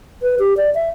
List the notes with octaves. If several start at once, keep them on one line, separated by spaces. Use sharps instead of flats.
B4
G4
D5
E5